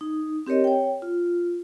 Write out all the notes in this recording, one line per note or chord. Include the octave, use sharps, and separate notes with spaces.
D#4
C4 G4 A#4 C#5 D#5
C#5 G5
F4